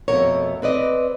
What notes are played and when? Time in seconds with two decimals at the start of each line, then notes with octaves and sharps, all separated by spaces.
0.08 F2 B2 A3 A#4 C#5
0.62 C4 B4 D5 D#5